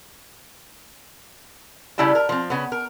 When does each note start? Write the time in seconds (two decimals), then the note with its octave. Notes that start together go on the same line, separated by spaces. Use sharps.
1.98 C#3 G3 E4 G5 A5
2.15 A#4
2.29 F3 C4
2.50 C#3 B3
2.72 A#4